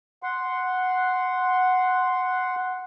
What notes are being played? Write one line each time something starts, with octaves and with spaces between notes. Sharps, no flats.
F#5 C6